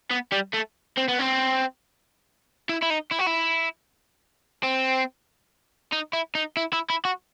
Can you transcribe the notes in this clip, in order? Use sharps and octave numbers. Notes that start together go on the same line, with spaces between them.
B3
G3
A3
C4
B3
C4
E4
E4
D#4
E4
F#4
E4
C4
D#4
E4
D#4
E4
E4
E4
F#4